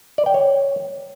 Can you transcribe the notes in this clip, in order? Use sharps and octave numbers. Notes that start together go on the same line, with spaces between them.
D5
G5
C#5